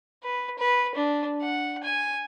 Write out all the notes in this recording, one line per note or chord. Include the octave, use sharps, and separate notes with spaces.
B4
B4
D4
F#5
G#5